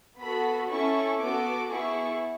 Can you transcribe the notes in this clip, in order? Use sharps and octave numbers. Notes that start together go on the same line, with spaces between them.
B3 F#4 A4 B5
C#4 E4 A4 C#6
B3 F#4 A4 D6
B3 E4 G#4 C#6